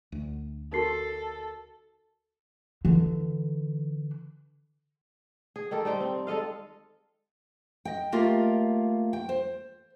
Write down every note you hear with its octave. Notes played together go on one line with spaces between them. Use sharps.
D2
D#4 F#4 A4 A#4 C7
D3 E3
G#4
D#3 G4 A4 A#4
G3 D#4 G4 C5
C4
G#3 A4 D#5 F5
D#5 G5
A3 A#3 F4 G4 A#4 D#5
G5
C5